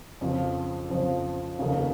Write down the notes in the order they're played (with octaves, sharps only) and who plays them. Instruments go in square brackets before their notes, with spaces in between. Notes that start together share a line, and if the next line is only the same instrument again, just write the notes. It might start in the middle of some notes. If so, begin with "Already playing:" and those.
[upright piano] F2 C#3 F3
F2 C#3 F3
F1 D#2 C#3